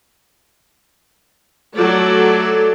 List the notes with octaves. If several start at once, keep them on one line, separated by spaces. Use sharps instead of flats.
F#3 A3 A4 D5